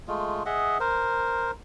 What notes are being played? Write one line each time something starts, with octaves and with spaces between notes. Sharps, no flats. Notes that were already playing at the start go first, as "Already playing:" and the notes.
G#3 A3 F4
G#4 D#5 E5 F#5
A#4 C5